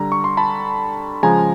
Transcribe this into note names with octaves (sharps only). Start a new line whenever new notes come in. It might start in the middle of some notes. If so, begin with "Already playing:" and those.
Already playing: D3 G3 A#5
C#6
C6
A5 B5
C#3 F3 G#3 G#5 A#5